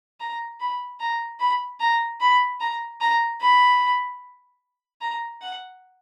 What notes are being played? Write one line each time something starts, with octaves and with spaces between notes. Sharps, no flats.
A#5
B5
A#5
B5
A#5
B5
A#5
A#5
B5
A#5
F#5